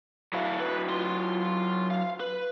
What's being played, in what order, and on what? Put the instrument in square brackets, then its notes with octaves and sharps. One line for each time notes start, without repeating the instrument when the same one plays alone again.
[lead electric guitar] A2 F5 [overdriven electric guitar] F#3 E4
[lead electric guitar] B4
F4 C6
F5
B4